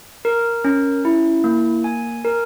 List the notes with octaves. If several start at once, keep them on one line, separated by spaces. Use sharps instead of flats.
A#4
C#4
E4
A#3
G#5
A#4